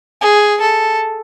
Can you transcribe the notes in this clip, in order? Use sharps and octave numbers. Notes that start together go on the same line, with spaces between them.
G#4
A4